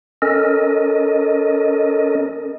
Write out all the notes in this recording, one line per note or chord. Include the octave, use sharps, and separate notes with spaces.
C#4 A4 A#4 D#5